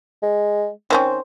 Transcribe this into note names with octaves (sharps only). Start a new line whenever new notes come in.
G#3
D#3 C4 C#4 C5